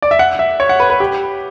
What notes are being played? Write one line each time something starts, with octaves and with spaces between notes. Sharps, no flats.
D5
E5
F#5
E5
C#5
F#5
B4
B4
G4